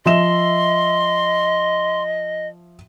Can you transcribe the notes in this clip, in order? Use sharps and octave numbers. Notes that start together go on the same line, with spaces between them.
F3 D#5 E5 C6 E7